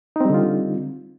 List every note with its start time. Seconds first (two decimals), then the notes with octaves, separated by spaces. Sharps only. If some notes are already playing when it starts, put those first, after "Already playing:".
0.16 D#4
0.20 C4
0.25 G3
0.30 D3
0.34 F4